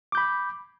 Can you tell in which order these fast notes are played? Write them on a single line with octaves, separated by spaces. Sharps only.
D6 G6 B5